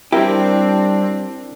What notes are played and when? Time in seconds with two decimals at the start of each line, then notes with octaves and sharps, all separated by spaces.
0.12 G3 C4 D4 E4 G4 A#4